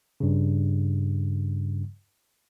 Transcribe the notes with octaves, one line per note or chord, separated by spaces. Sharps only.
G2 C#3